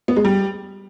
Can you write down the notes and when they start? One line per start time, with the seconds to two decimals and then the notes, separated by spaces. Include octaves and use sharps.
0.08 B3
0.16 G#3
0.25 G3